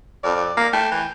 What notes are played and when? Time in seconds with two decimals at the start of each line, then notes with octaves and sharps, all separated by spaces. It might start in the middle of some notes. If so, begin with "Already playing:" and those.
0.24 F2 D5
0.57 A#3
0.73 A3 G5
0.91 E3